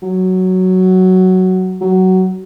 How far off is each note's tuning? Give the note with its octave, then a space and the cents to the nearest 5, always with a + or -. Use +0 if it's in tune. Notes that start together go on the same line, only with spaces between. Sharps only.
F#3 +5
F#3 +15